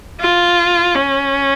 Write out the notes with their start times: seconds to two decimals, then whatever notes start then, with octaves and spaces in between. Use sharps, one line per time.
0.20 F4
0.95 C#4